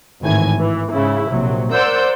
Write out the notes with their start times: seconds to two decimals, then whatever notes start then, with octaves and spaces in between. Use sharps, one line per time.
0.21 G#1 A2 D#3 E3 G#5 G#6
0.58 E3
0.93 G#2 C#3 E4
1.30 A#1 C3 F#3
1.72 A#4 C5 D5 F#5 E6 G6